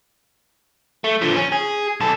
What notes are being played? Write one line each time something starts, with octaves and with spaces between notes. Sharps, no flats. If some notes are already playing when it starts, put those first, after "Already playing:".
A3
D3 F3
C#4
G#4
B1 A4